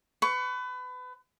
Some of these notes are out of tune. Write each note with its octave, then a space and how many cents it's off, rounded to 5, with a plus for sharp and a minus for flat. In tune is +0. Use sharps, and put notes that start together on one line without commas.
B4 +30 C#6 +15